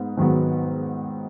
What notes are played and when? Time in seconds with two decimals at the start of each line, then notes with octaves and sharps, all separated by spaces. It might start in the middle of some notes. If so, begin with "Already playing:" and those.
Already playing: G#2 B3
0.17 G#2 D#3 F#3 B3